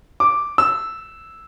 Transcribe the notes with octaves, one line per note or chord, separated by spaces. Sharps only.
D6
E6